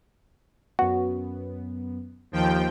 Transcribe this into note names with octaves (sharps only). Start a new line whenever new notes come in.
F#2 B3 F#4
D#2 F3 G5